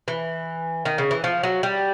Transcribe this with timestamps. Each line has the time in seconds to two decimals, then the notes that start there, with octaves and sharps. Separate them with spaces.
0.08 E3
0.85 D#3
0.98 C#3
1.11 E3
1.24 F3
1.43 F#3
1.63 G3